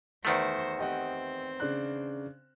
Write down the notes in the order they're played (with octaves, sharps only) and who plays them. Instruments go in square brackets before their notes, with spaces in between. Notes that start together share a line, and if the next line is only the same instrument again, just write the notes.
[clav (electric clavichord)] E2 D#3 A3 [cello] F#4 C5
[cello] C4 [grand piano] G4 D#5 F#5
[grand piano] C#3 D4 F#6